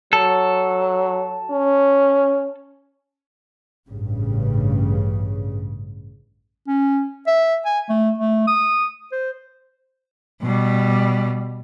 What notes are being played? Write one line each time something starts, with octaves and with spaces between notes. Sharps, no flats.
F#3 A4
C#4
A1 G2 C#3
C#4
E5
G#5
A3
A3
D#6
C5
B2 G3